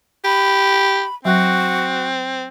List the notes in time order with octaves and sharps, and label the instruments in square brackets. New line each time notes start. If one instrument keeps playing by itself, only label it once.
[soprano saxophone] G4 [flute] B5
[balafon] F#3 [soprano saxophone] C4 [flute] F#4